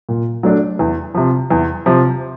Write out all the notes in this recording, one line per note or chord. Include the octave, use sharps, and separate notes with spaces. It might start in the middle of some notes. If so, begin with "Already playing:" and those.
A#2
F#3 A3 D4
E2
C3 F3
E2
C3 F3